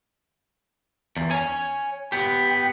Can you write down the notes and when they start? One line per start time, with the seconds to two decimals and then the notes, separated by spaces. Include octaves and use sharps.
1.17 E2
1.31 C#5 G#5
2.12 B3 G4